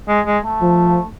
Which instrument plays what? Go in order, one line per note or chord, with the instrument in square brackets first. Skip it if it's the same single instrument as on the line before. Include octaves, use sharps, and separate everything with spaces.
[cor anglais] G#3
G#3
A3
[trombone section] F3